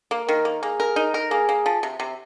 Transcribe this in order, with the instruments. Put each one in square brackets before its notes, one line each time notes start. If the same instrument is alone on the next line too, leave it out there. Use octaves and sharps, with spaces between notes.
[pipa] A#3
[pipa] D#3 [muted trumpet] A#4
[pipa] A#3
[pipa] A#3 [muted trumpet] G#4
[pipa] A#4
D#4
A#4
[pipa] A#3 [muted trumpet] G#4
[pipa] A#3
F3
C3
C3